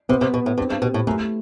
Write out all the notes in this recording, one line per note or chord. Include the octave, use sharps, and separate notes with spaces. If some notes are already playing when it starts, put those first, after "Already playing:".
C3 B3
C3
B2 B4
A2
G2 C4
G2
B2 G4
A2
F#2 A3